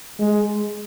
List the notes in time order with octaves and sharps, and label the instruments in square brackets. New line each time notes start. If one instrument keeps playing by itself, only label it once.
[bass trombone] G#3